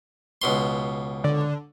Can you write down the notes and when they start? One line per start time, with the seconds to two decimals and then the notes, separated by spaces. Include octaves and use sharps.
0.42 C#2 B2 C6
1.24 D3